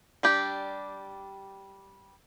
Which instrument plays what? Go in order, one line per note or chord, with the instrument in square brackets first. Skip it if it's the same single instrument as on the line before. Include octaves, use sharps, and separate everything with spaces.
[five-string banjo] G3 D4 G4